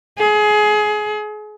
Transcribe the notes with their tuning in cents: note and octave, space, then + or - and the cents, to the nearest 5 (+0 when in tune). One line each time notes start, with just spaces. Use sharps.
G#4 +25